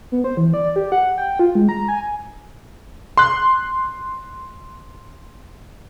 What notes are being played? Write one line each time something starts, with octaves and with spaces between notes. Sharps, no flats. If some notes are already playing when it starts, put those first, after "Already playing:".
B3
C5
E3
D5
G4
F#5
G5
F4
G#3
A#5
G#5
C6 F#6